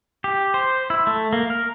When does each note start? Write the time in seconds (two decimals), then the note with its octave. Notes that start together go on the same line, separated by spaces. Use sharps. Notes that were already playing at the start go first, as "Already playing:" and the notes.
0.24 G4
0.54 C5
0.90 E4
1.07 A3
1.33 A#3
1.50 A#4